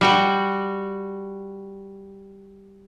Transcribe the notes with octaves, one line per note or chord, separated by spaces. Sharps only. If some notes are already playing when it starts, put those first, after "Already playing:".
G3 F#4 G5